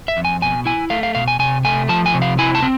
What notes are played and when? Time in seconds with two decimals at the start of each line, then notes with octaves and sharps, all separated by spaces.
0.08 E5
0.17 F2
0.25 G#5
0.42 B2 G#5
0.66 E4 G#5
0.90 A3 F5
1.03 F5
1.15 B2 F5
1.28 G#5
1.39 C3 G#5
1.65 A3 G#5
1.89 F3 A5
2.06 G#5
2.14 C3
2.22 F5
2.39 E4 G#5
2.55 A5
2.62 C4